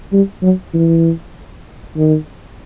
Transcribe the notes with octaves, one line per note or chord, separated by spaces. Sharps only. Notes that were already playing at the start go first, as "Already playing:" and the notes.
G3
F#3
E3
D#3